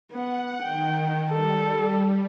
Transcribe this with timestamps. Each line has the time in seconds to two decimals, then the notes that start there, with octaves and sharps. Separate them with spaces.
0.12 B3 F#5
0.63 D#3 G5
1.31 G3 A4